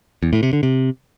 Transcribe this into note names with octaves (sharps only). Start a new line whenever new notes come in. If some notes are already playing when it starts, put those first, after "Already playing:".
E2
A2
C3
D3
C3